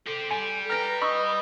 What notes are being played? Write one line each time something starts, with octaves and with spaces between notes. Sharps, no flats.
G4 A4 C5
G3 G#5
B4 G5 A#5 F6 A#6 D7
D#5 B5 C#6 E6